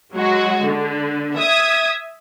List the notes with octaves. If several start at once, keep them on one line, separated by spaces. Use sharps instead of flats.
F#3 G#3 F#4
D3
E5 D#6 G#6